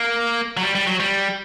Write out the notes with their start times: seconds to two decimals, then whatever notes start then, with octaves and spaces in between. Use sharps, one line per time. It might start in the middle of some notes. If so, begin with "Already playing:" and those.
Already playing: A#3
0.57 F#3
0.62 G3
0.75 G3
0.87 F#3
1.00 G3